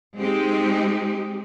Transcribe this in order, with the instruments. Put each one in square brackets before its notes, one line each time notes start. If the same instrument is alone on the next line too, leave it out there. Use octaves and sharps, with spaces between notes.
[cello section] G#3 C4 D#4 G4